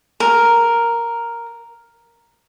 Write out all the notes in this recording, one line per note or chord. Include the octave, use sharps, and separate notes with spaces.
A#4